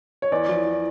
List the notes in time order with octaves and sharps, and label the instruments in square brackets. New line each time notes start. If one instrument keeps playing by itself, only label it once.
[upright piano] C#5
E2 D5
F3